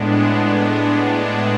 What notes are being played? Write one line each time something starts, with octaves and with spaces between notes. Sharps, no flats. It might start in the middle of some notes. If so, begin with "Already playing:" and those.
Already playing: A2 G#3 B3 D4